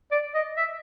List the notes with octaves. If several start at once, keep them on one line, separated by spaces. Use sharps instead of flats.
D5
D#5
E5